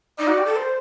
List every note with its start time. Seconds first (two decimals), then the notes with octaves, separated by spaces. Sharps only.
0.18 D#4 D5
0.27 F#4
0.37 G4
0.45 A4
0.56 C5